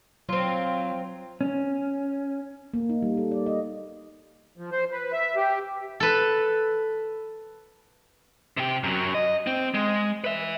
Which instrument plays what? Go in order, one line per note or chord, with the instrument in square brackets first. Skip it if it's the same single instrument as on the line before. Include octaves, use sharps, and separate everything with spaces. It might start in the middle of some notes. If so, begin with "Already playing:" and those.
[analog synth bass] F#3 [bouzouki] C4 F4
[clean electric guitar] C#4
[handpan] A#3
D#4
G3
A4
D5
D#5
[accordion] F3
C5
B4
E5
G4
[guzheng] A4 B4
[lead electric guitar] C3 G4
F#2 F#3
D#5
C4
G#3
B4 E5